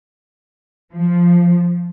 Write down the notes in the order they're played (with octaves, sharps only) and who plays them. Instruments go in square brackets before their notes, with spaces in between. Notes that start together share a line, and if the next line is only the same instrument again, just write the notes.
[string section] F3